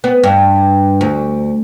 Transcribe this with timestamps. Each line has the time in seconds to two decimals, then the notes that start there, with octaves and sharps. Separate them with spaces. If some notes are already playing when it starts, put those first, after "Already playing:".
0.04 B3
0.24 G2
1.01 D2